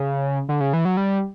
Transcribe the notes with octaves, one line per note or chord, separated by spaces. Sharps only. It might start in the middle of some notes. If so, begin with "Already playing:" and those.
Already playing: C#3
D3
C#3
E3
F#3
G3